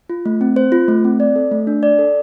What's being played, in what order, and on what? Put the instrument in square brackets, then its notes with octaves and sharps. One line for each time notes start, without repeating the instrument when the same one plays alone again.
[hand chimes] F4
A3
C4
C5
F4
A3
C4
D5
A4
A3
D4
D5
A4